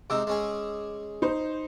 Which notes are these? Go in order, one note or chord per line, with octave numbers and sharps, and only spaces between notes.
C3 G#3 D#4 D6 E6
G#3 C#4 G#4
D#4 C5